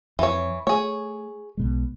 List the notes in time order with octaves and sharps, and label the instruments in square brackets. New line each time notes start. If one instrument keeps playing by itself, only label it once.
[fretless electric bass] F2 [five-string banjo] E3 C#5
[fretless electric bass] A3 [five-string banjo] G#4 C#5
[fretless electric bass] B1 B2 G#3